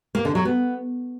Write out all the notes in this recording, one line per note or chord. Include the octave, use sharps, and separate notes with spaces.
A#3
D3
F#3
B3